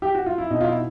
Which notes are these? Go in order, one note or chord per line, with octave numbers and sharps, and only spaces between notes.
G4
F#4
F4
E4
B2 D#4
F4
E4